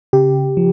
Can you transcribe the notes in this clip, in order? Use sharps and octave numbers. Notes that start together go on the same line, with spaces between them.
C#3 G4
F3